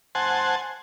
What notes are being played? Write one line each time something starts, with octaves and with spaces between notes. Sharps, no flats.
C5 F#5 G#5 A5